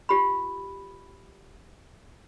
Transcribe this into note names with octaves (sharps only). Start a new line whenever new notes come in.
F4 G4 B5